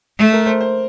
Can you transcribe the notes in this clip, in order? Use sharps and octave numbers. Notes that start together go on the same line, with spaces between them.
A3
A#4
C5
C5